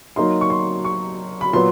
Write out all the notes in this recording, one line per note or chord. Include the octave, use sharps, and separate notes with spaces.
F#3 A#3 D#4 C6
C#6
C6
C#6
B5
A#2 F#3 B3 C6